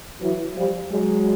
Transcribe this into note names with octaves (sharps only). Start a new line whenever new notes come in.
E3 F#3
F3 G3
F#3 G#3